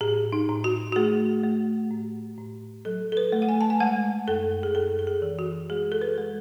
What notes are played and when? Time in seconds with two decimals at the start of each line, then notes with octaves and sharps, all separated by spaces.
0.01 A2 G#4
0.32 D#4
0.49 A2
0.64 F#4
0.92 F#4
0.96 A3 G#4
1.43 A3
1.91 A2
2.38 A2
2.85 F#3 A4
3.12 A4
3.17 B4
3.32 A3
3.42 F#5
3.49 G#5
3.61 A5
3.70 G#5
3.80 G#3 F#5
4.28 F#2 A4
4.63 G#4
4.75 F#2 A4
4.99 A4
5.07 G#4
5.22 E3
5.39 F#4
5.70 G#3 G#4
5.92 A4
6.01 B4
6.18 G#3